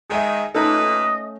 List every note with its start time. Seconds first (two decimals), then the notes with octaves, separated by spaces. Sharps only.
0.10 D#3 G#3 G#4 D#5 E5
0.55 A#2 A3 C#4 D#4 A4 B4 D#5